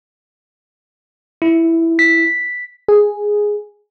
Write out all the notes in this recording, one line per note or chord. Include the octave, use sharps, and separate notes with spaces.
E4
B6
G#4